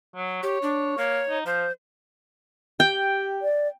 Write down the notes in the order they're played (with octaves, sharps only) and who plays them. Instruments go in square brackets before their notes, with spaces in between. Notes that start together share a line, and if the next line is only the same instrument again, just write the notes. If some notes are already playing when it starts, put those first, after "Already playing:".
[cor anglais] F#3
[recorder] G4 [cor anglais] C#5
[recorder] D4
[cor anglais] A#3 [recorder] C#5
[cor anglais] D#4
[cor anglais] F3 [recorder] C5
[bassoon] G4 [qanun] G5
[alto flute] D5